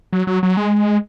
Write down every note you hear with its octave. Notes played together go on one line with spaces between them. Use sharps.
F#3
F#3
F#3
G#3